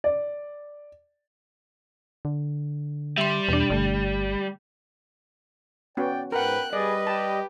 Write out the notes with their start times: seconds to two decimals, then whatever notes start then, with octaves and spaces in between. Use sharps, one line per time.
0.04 D5
2.25 D3
3.18 G3 E5 C6
3.49 E2 B2 D4
3.70 G1 D3 A3
5.97 B3 C#4 F#4 D5 G5
6.32 G#2 A#4 B4 F#5 G5 F#6
6.73 G3 G#4 B4 D5 D#5
7.07 G4 A5